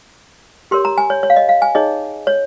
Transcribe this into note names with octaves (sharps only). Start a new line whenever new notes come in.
G4 A#4 C#5 C6
A#5
G#5
C#5
C#5
F5
D#5
F5
G#5
D#4 G#4 C#5 D#5
C#5